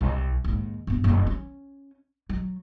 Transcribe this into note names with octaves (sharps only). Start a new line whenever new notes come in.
C2
D#2 G#2
G2 B3
F#1
C#4
F#3